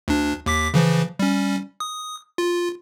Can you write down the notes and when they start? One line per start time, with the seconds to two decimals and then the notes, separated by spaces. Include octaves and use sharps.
0.08 D2 D4
0.46 D#2 D6 B6
0.74 C#3 E3 F3
1.19 G3 C#4
1.80 D#6
2.38 F4